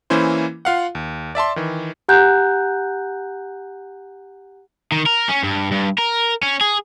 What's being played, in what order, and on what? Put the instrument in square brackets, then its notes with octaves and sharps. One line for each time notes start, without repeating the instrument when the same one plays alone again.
[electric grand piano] E3 A#3 C#4 E4 C5
F4 F5 F#5
D#2
D5 E5 A5 C6
D#3 E3
[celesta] G4 F#5 G#5 A#5 F#6 G6
[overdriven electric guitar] D#3
A#4
C#4
G2
G2
A#4
C#4
G#4